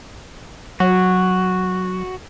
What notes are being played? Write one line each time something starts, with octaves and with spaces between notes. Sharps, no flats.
F#3 F#4